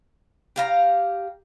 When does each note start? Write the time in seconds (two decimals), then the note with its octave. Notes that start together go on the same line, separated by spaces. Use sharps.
0.56 G4 F5 A#5